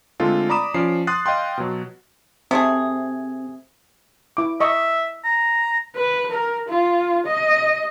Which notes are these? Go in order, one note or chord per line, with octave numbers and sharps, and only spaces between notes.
D3 G#3 A3 C4 F4 A4
D5 A#5 B5 D6 D#6 E7
F3 C#4 D5 C7
C6 D#6 F#6 A6 C7
D#5 F5 G5 C6
B2 F#3
C3 A3 C4 G#4
E4 D6
D#5 E5 C#6
A#5
B4
A#4
F4
D#5